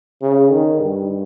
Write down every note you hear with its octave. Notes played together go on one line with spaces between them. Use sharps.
C#3
D#3
G2